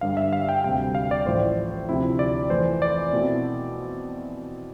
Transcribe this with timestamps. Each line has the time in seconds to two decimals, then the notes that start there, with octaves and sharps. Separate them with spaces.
0.01 G2 D3 G3 F5
0.17 E5
0.33 F5
0.49 G5
0.64 D2 C3 G3 G5
0.95 F5
1.11 D5
1.26 A1 A2 F3 C5
1.89 D2 C3 F3 C4 E4
2.19 D5
2.50 F2 E3 A3 C5
2.82 D5
3.13 B2 A3 C4 E4